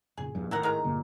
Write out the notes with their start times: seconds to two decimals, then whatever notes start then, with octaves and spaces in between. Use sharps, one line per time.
0.17 F2 A#2 C#3 G#4
0.35 A#1 E2 G2
0.51 G#1 A2 D#3 E4 A#4 F#5
0.63 G#3 A#4 A#5
0.84 A1 G2 A#2 D3